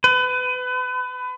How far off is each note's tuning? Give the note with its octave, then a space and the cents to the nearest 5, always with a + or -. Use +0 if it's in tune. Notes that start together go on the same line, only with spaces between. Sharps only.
B4 +30